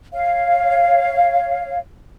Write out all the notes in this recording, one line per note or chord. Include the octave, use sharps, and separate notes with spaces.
C#5 F5